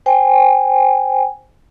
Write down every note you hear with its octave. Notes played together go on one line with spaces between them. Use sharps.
C5 G5 G#5